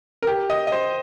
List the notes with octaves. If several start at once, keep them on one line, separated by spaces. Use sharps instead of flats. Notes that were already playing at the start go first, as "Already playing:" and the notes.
A#4
G4
D#5
D#5
C5